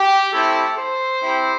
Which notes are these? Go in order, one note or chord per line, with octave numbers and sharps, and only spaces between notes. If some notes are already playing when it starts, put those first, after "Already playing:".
Already playing: G4
A3 C4 E4 G4 A4
C5
C4 E4 G4